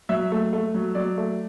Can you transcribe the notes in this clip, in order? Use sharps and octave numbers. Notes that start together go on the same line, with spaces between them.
F#3 E5
A3
A3
F#3
F#3 D5
A3